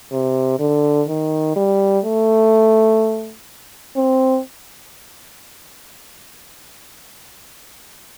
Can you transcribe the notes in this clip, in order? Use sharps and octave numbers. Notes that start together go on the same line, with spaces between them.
C3
D3
D#3
G3
A3
C4